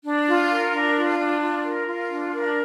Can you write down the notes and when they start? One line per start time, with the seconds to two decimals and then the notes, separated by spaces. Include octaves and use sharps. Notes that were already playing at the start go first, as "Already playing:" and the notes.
0.05 D4
0.28 F4
0.50 A#4
0.73 D4
0.96 F4
1.19 D4
1.42 F4
1.64 A#4
1.87 F4
2.10 D4
2.33 A#4